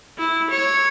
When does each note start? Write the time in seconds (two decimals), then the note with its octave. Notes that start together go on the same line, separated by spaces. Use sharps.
0.18 E4
0.50 C#5